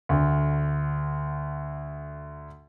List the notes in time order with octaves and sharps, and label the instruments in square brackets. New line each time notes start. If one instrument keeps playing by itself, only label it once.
[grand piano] D2 D3